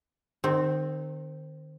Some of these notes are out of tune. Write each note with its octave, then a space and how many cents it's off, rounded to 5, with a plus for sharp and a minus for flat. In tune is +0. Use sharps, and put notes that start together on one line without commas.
D#3 -30 C4 +0